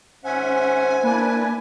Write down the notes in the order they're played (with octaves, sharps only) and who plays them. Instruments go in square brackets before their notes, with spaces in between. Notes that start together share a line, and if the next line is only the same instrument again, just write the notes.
[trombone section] G#1 C5 [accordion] C#4 E5 F#5 [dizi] G#5
[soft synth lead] A#3 [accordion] D4 E4 B4